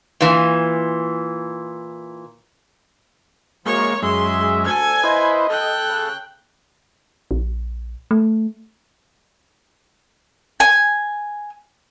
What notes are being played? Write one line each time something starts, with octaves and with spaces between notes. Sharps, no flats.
A#2 E3
F#2 F3 G#3 A#3 C#5 C#6
F#2 G#3 G#4 E5 C6
D2 A4 G#5 G#6
E4 B4 C5 D#5
A4 G5 F#6
C#3
A#1
A3
G#5